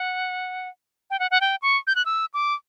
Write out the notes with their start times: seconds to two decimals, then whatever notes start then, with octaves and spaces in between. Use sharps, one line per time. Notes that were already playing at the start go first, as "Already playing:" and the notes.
Already playing: F#5
1.10 G5
1.19 F#5
1.31 F#5
1.41 G5
1.62 C#6
1.87 G6
1.96 F#6
2.06 E6
2.34 D6